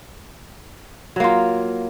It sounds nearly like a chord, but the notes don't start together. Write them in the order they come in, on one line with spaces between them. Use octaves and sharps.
F#3 A#3 F4